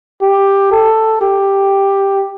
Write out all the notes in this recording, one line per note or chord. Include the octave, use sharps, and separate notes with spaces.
G4
A4
G4